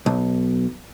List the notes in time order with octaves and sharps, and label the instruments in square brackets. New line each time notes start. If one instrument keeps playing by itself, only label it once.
[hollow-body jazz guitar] B1